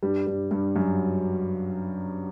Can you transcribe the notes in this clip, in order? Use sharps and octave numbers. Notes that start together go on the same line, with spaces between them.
G2 G3
G2 G3
G2 G3
F#2 F#3